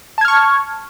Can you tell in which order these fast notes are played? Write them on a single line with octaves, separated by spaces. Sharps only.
A5 G#6 F6 C#6